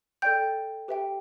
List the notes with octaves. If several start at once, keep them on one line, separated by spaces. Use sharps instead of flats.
A4 D5 G5 G6
G4 B4 E5 G5